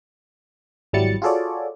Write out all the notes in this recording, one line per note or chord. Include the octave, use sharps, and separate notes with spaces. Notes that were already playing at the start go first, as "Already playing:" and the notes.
G#1 F#3 G3 E4 A6 C#7
F4 F#4 G#4 A4 C#5 D5